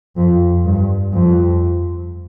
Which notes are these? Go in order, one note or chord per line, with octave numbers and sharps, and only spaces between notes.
F2
G2
F2